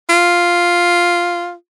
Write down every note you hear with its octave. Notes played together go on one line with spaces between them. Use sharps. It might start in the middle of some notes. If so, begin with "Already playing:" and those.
F4